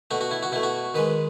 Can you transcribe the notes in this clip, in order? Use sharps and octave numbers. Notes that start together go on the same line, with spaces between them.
B2 A3 F#4
F#4
E4
F#4
B2 A3 E4
F#4
D#3 G#3 B4